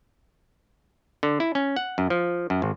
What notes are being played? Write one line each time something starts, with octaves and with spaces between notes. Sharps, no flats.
D3
E4
C#4
F#5
F#2
F3
F#2
G#1